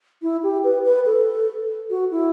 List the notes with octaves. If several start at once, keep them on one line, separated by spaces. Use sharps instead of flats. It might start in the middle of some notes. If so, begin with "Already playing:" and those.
E4
G4
B4
B4
A4
F#4
E4